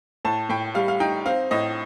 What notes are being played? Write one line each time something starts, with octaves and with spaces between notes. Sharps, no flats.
A2 A5
A2 G5
G3 F5
F5
D#4 G5
C4 F5
A2 D#5